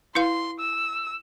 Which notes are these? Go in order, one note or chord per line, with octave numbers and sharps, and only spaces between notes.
E4 B4 F5 C6
E6